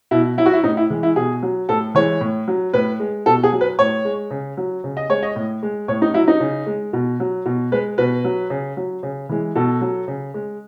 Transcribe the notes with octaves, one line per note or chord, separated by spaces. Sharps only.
B2 E4
F#3 E4
F#4
E4
A2 D#4
E4
E3 G#3
E4
B2 G#4
F#3
A2 A4
E3 G#3 C#5
A2
F#3
A2 B4
G#3
B2 A4
G#4
F#3
B4
A2 C#5
G#3
C#3
F#3
C#3
D#5
G#3 C#5
D#5
A2
G#3
A2 C#5
D#4
F#3 E4
D#4
C#3
G#3
B2
F#3
B2
G#3 B4
B2 B4
F#3
C#3
F#3
C#3
E3 G#3
B2 A4
F#3
C#3
G#3